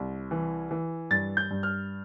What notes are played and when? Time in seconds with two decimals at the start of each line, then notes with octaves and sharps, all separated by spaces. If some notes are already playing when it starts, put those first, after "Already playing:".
Already playing: C2
0.31 E3
0.71 E3
1.10 G2 A6
1.37 G6
1.50 G2
1.63 F6